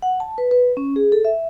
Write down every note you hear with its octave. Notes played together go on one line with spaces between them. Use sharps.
F#5
A5
B4
B4
C#4
G#4
A4
E5